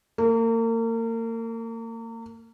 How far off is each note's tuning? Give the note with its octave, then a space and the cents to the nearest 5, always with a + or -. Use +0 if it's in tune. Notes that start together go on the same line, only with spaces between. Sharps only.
A#3 -35 A#4 +0